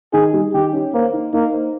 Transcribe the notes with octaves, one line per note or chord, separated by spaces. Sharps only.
D#3 G#4
G3
D#3 G4
C#4
A#3 C5
D#4
A#3 D#4
C5